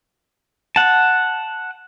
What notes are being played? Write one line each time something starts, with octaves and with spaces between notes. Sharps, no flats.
F#5 A5